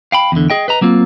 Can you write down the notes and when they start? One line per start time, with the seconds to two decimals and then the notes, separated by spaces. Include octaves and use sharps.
0.12 F5 G5 B5
0.32 E2 D3
0.50 G#4 D#5 G5
0.68 B4 D#5 A#5
0.81 F#3 A#3 C4 F4